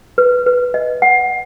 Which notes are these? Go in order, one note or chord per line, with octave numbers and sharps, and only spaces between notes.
B4
B4
D#5
F#5